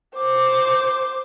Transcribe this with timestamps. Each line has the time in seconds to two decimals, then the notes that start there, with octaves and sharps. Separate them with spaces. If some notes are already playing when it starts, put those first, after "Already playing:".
0.16 C5 D6